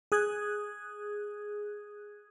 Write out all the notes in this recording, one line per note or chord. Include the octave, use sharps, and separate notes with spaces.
G#4 D#6 F#6 G#6